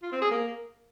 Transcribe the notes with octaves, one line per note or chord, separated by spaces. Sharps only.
F4
C4
G#4
A#3